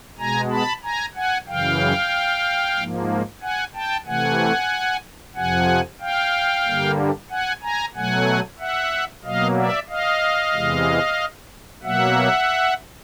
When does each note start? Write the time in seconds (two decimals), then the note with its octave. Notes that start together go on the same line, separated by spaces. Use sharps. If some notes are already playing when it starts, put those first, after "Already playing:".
0.18 B2 G#3 G#5 A#5
0.50 A5 B5
0.83 G#5 A#5
1.15 F#5 G#5
1.47 F#2 C#3 E3 F5 G5
2.77 G#2 F3 A#3
3.41 F#5 G#5
3.74 G5 A5
4.06 C3 E3 A3 F#5 G#5
5.35 F2 C3 F3 F#5 G#5
6.00 F5 G5
6.65 G2 D3 G3 A#3
7.30 F#5 G#5
7.62 G#5 A#5
7.95 B2 F#3 A3 F#5 G#5
8.59 E5 F#5
9.24 B2 F#3 A#3 D#5 F5
9.57 D5 E5
9.89 D#5 F5
10.54 E2 C3 E3 G#3
11.83 B2 F#3 A#3 E5 F#5